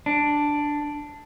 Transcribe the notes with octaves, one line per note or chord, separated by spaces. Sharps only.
D4